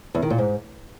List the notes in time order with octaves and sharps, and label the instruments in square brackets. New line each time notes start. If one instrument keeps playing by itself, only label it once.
[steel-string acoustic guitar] E2
D#3
A#2
G#2